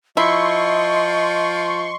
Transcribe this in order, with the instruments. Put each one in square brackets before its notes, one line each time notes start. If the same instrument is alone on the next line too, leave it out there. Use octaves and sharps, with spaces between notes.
[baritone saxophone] F3 [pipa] E4 [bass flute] D#5 [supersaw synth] C6 C#6